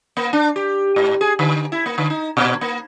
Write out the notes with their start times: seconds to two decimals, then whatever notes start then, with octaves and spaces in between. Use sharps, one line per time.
0.17 A#3
0.33 D4
0.56 G4
0.96 G#2
1.21 G#4
1.39 D3
1.72 E4
1.86 A#3
1.98 D3
2.10 D#4
2.37 A#2
2.61 A#3